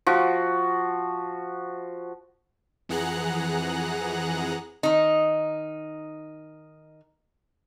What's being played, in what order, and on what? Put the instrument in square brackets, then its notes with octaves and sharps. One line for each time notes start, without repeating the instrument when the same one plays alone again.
[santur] F3 F#4
[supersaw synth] F2 E3 G#4 F#5 A#5 F#6
[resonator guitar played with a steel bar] D#3 D#4